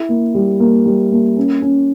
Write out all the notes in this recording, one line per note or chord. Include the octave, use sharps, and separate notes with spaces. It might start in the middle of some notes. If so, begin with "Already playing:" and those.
Already playing: E4
A#3
G3
A#3
G3
A#3
C#4
C#4